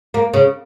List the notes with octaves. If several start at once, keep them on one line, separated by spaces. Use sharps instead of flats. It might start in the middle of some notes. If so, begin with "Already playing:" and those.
A#3
C#3